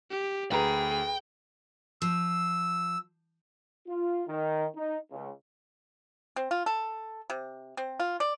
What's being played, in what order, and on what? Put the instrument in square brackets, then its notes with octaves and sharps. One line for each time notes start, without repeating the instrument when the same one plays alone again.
[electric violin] G4
[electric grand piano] D2 [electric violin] G#4 [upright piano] B4 A#5 B5 [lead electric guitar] G5
[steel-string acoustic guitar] F3 [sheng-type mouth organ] E6
[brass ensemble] F4
D#3
D#4
C#2
[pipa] C4
F4
A4
C3
C4
F4
D5